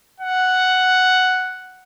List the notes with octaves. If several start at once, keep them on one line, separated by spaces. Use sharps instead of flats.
F#5